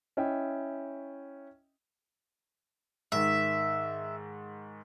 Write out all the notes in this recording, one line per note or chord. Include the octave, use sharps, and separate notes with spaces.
C#4 E4 D#5 E5 G5
G#2 D#3 E5